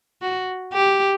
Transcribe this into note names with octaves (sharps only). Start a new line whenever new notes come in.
F#4
G4